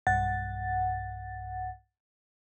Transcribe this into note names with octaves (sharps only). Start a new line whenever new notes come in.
B1 G2 F#5 A6